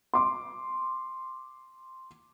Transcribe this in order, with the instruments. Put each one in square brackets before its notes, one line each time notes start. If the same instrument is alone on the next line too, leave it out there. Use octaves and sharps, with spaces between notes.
[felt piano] C6 D6